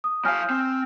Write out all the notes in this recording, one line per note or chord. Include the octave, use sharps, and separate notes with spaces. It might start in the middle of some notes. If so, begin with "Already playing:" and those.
D#6
F#3 F5 G#5 F6 G6
C4